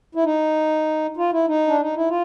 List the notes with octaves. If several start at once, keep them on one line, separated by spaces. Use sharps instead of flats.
E4
D#4
F4
E4
D#4
D4
D#4
E4
F4